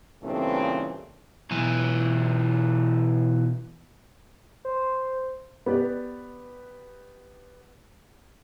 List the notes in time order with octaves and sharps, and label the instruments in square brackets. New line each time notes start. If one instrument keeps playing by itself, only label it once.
[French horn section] G2 A#2 C#3 E3 A3 C4
[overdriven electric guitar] B1 E3
[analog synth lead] C5
[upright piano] B3 G4 B4 D5